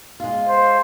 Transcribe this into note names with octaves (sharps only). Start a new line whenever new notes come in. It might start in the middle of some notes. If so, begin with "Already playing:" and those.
G#3 F4
C5